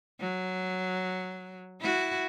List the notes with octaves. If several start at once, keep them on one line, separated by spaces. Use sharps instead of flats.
F#3
E4 F#4